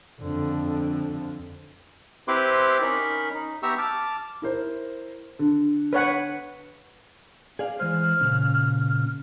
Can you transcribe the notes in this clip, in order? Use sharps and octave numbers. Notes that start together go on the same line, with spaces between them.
F2 D3
C4 E4 G4 B4 C6 D6
C#4 D#4 A#4 B5
D#4
B3 G4 E5 A#5 C#6 E6
A5 D6 F6
E4 A#4 C5
D3
B4 C#5 F#5
G#4 D5 F5
E3 G#3 C5 F6
A#2 C#3